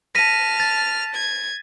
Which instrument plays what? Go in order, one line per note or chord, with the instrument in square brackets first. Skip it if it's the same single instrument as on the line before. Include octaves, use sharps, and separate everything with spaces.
[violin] A5 F6 [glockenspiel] A#6 B6 D#7
[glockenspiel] A6
[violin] G#6